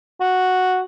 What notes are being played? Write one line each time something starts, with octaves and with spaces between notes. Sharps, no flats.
F#4